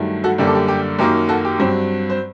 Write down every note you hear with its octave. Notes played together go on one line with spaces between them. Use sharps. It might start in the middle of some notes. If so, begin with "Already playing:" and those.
Already playing: G2 D#3 F#3 A3
F#4 A4
F#2 D3 G3 A#3 G4
A4
G4
G4
F#2 D#3 F#3 A#3 G4 A#4
F#4 A4
G4
G2 F#3 C4
C5